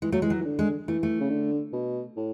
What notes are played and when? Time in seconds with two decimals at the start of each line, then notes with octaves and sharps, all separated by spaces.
0.02 E3 G#3
0.12 F#3 A3
0.22 E3 G#3
0.30 F#3
0.41 E3
0.45 D3
0.59 G#3
0.88 E3 A3
1.03 A3
1.20 C#3
1.30 D3
1.73 B2
2.16 A2